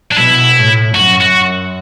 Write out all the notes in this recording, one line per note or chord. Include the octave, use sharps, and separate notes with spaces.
D4
B2 E4
A2
F#2 F#4
F#4